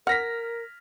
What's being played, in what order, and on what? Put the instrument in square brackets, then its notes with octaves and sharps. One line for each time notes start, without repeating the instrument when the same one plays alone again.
[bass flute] A#4 [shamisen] F#5 [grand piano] F6 A#6 B6